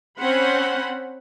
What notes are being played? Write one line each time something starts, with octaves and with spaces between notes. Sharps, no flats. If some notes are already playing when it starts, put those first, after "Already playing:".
C4 C#4 C5 F#5 B5